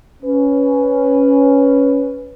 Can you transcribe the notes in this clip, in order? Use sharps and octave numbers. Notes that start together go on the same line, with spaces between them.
C#4 B4